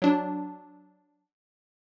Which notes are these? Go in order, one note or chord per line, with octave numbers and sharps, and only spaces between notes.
F#3 D4